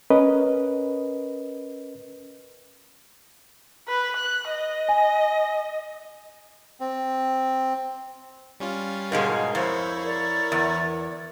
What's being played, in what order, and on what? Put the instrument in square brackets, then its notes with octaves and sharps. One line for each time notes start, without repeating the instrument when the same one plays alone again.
[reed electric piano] C#4 A#4 B4 D#5
[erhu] B4
F#6
D#5
[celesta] G#5
[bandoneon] C4
[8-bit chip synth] G3 C#4 F4
[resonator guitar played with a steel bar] G#2 B2 G#3 [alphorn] A#4 [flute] F5
[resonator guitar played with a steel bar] F2 [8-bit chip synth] E4 C#5 [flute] C5
[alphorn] A#4 [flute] D5
[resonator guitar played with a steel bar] E2